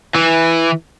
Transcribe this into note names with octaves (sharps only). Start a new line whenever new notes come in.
E3